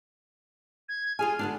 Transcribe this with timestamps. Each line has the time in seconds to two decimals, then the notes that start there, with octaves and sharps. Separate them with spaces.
0.89 G#6
1.19 F4 G#4 G#5 F6
1.39 D3 B3 D4